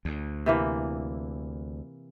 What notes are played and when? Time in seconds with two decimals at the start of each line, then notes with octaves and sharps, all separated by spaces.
0.05 D2
0.46 C3 E3 A#3